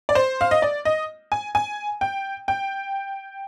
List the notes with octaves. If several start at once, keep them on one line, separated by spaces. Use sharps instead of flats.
D5
C5
F5
D#5
D5
D#5
G#5
G#5
G5
G5